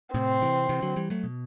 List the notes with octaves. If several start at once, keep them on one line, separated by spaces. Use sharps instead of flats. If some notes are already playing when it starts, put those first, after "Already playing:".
A2 C3 C4
C3 E3
C3 E3
D3 F#3
E3 G3
F#3 A3
B2